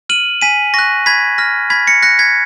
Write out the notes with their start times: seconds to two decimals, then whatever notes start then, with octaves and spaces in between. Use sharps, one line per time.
0.09 F6 D#7 F#7
0.42 G#5 B6 D#7
0.74 C#6 F#6 A#6
1.06 B5 G#6 B6
1.38 F6 A#6
1.70 B5 G#6 B6
1.87 A#6 C#7
2.02 F#6 A#6 C#7
2.19 G#6 B6